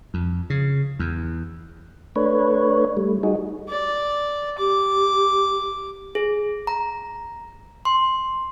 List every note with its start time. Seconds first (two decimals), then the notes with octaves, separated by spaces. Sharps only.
0.14 F2
0.50 C#3
0.99 E2
2.16 A3 D4 B4 C#5
2.97 G3 A3
3.23 G3 D#4 F#4 G#4
3.69 D5
4.58 G4 D6
6.15 G#4
6.67 A#5
7.85 C6